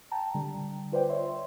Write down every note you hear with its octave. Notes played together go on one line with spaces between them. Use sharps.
G5 A5 A#5
D3 G3
F4 B4 C5 D5 G5
C#5 E5 C6